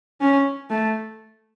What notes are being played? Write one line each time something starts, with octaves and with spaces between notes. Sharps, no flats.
C#4
A3